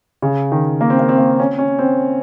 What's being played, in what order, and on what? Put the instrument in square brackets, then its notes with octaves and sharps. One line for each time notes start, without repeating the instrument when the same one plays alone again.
[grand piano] C#3
D#3
A#3
C4
A#3
C4
A#3
C#4
C#4
C4